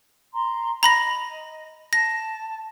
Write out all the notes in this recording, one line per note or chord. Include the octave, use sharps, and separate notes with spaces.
A#5 C6
D#5 A#5 B5 A#6
A5 A#6